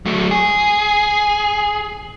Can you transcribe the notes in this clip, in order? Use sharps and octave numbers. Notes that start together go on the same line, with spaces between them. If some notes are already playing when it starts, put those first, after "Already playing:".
F#3 A3
G#4